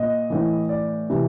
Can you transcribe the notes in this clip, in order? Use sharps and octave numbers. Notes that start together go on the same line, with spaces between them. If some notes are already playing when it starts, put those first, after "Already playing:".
Already playing: A#2 D#5
A2 E3
D5
C3 E3